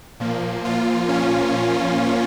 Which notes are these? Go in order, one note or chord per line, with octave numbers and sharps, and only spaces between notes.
A#2 F3 A#3
F4
C#4